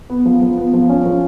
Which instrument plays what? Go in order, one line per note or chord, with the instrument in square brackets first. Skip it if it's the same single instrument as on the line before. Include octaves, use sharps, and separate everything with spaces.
[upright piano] B3
F3
F3
B3
F3
C#4
F3